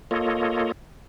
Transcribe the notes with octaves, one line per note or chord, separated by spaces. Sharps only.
A#3 F4 A4 C#5 D#5